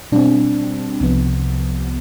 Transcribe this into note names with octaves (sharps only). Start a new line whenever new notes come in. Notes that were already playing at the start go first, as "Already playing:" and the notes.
B2 G3 C4 D4
C2 C3 F3 B3